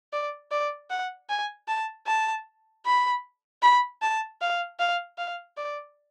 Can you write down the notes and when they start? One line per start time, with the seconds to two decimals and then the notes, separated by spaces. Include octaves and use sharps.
0.13 D5
0.51 D5
0.90 F#5
1.29 G#5
1.68 A5
2.07 A5
2.86 B5
3.62 B5
4.02 A5
4.41 F5
4.79 F5
5.18 F5
5.57 D5